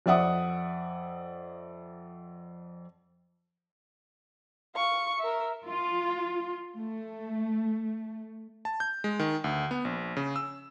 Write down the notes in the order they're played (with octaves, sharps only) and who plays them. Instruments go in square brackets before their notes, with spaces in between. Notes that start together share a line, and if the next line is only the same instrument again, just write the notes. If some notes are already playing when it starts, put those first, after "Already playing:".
[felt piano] F2 D5 E5 F#5 D#6
[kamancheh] F5 C#6
A#4 E5
[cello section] F4
A3
[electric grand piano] A5
G6
G#3
D#3
D2
B3
A#1
C#3
E6